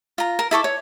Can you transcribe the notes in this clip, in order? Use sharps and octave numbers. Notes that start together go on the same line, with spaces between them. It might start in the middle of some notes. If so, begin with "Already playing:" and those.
F4 A#5
A#4
E4 A4 C#6 D6
C#5